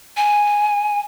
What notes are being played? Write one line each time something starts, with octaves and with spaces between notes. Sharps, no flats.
G#5